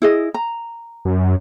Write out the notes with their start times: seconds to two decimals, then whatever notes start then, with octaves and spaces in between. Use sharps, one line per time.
0.02 E4 G#4 D#5
0.34 A#5
1.05 F#2